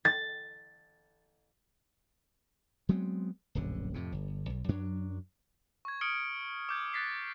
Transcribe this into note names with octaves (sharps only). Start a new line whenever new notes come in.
A6
F#3 G#3 B3 C4
D1 A#1 F#2 D3
F2 A2 C3
G1
B1
F#2 F#3 D4
C#6 G#6
D#6 F6 G#6 C#7 D7 G7
D6 G6 G#6
F#6 G#6 A6 B6 C7